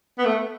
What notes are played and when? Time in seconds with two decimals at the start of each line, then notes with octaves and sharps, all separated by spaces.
0.18 B3
0.25 A3